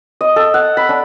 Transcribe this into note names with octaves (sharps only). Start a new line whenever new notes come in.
D#5
A4
F#5
B5
D4